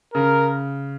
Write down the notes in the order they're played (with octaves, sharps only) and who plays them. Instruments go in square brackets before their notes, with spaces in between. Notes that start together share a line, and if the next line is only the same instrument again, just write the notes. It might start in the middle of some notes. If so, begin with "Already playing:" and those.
[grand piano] C#3 [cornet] A#4